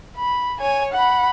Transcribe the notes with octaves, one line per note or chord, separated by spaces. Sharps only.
B5
C#5 G#5
F#5 B5